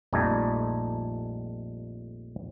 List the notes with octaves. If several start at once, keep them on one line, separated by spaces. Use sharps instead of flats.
A#1 F2 G3 A3 D#4 G#5